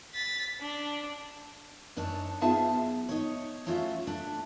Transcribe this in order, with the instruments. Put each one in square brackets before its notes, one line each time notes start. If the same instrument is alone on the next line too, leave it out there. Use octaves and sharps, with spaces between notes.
[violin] A6 B6
D4
[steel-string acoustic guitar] F#2 D4 D#4 C#5 A5
B3 D#4 F4 G#4 E5 A5
F#2
D#4 C#5
F#3 A3 C#4 F4 F#4 E5
A3 D4